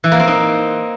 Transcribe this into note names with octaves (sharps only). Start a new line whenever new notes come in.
E3
A#3
C4
D#4